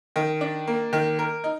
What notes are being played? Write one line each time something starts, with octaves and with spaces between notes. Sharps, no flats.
D#3
D4
A#3
D#3
A#4
D#4